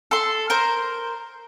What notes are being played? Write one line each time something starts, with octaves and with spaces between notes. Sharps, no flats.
A4 C6
A#4 C5